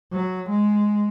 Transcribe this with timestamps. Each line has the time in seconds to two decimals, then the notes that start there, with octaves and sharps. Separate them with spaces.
0.12 F#3
0.49 G#3